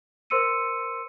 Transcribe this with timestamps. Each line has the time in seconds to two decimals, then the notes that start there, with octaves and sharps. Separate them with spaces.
0.30 A#4 C5 C6 E6 C#7 D#7